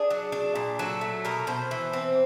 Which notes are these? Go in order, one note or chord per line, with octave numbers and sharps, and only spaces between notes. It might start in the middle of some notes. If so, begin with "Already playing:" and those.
Already playing: D4 G#4
F#3
D4
A#2
F#3 A4
A3
B2 A#4
B2 C5
E3
C4